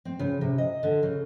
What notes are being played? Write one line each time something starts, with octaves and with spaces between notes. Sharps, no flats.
C4
C#3
C3
D#5
D3
C#3